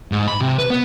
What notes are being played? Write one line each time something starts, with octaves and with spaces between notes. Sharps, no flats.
G#2
B5
C3
B4
B3